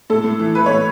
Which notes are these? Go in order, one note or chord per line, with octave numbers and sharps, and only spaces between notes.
A2 A4
A2
E3
E3 B4
C#5
A2